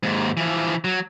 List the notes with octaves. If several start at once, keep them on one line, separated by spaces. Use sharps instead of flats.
D#2 G#2
E3 F3
F#3